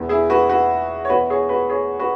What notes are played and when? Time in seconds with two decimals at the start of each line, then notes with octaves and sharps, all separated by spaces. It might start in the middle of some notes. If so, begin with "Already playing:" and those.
Already playing: E1 E2 E3
0.09 E4 G#4
0.30 F#4 B4
0.49 F#4 B4
1.05 C#5
1.09 E1 E2 E3 F#4 B4
1.30 G#4 C#5
1.49 F#4 B4
1.70 G#4 C#5
2.00 F#4 B4